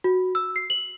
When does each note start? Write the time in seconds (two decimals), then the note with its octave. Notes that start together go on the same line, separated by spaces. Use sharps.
0.04 F#4
0.35 E6
0.56 C7
0.70 F#7